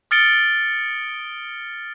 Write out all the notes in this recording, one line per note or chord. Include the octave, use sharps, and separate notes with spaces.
D#6 F6 A6 C#7 D7 G7